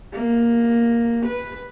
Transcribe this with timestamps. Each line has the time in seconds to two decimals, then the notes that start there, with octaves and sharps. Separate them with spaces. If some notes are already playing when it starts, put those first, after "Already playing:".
0.13 A#3
1.26 B4